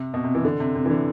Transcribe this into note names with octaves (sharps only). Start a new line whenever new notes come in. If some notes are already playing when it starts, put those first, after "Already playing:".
Already playing: C3
B2
C3
E3
D3
C3
C3
E3
D3